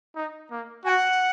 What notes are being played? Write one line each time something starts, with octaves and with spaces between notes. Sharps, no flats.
D#4
A#3
F#4 F#5 G#5